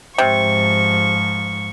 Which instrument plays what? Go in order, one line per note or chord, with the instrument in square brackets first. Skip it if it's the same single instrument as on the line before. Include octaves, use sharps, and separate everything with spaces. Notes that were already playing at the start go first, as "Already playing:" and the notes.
[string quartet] G#2 F3 C#6 [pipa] C3